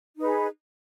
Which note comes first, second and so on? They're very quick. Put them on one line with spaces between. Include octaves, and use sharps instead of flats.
D#4 B4 G#4